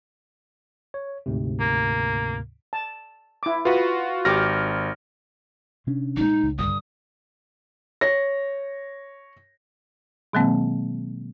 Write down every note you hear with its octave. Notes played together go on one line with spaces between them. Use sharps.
C#5
D2 G#2 C3
A#3
A5
E4 D6
F4 F#4 B4
G#1 F#4 G4 D6 F6 A#6
C3 C#4 D4
A#2 G#3 D#4
C#2
G2 D3 D#6
C#5 A#6
B2 D#3 F#3 G#3 A#3 C4